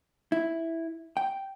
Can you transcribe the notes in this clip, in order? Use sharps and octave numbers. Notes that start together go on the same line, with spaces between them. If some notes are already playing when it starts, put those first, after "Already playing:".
E4
G5